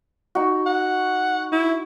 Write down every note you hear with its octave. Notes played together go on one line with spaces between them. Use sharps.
D#4 F#4
F#5
E4